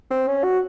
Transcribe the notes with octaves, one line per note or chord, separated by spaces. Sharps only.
C4
C#4
F#4